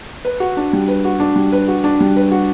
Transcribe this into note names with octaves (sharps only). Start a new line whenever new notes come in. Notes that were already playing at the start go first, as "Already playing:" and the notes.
B4
F#4
D4
G3
B4
F#4
D4
G3
B4
F#4
D4
G3
B4
F#4